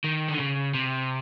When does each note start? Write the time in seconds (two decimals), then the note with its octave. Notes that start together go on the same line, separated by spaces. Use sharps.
0.04 D#3
0.28 D3
0.40 C#3
0.74 C3